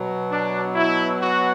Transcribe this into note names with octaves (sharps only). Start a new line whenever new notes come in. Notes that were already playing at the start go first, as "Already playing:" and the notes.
Already playing: B2 F#3
D4
E4
F#4